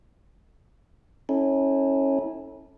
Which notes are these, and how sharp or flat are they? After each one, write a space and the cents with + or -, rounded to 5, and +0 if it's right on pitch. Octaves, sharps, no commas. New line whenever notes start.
C#4 -20 E4 -40 A4 +0